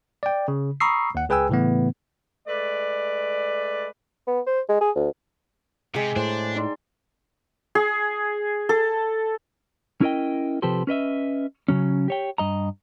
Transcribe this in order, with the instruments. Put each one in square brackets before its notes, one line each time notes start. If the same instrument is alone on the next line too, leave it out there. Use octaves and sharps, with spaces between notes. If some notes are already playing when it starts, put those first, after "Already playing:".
[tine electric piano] D5 G5
C#3
A#5 B5 C#6 D#6 E6 C7
D#2 F#5
C#2 G#4 B4 G5 G#5 E6
A2 C#3 E3 A3 B3
[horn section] G#3 A3 B4 D5
[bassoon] B3
C5
G#3
G#4
D2
[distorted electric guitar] C3 [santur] G#3 G5
[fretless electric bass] A2 [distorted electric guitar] D4 [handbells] C5 C6
[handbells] D#4 D5 C6
[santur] G#4
A4
[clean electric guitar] C#4 E4 A#4 D#5 G5
C3 F3 G4 A4 B4 C5
C#4 B4 D#5 E5
C#3 F#3 C#4
G4 C#5 G5
G2 D#5 A#5